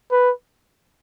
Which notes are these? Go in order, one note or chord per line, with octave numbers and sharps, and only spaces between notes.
B4